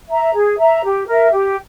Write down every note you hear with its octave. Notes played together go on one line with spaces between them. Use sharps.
E5 A#5
G#4
E5 A#5
G4
A#4 E5
G4